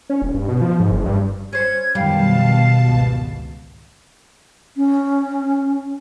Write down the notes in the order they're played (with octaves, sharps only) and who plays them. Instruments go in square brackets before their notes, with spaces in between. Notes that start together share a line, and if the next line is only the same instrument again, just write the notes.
[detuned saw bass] C#4
E1
G2
B2
F3
G#2
F#1
G2
[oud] C#4 C5 [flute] G#6
[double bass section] F#2 D#3 F3 [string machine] B2 A5 [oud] G3 [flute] F5
[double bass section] G#1 C#2
[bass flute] C#4